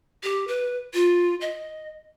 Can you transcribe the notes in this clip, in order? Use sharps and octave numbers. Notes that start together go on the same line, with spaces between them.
G4
B4
F4
D#5